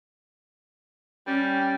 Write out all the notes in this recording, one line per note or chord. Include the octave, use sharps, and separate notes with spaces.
G3 C#4